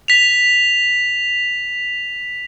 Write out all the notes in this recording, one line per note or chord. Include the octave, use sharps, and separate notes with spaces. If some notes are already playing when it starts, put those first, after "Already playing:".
B6 F7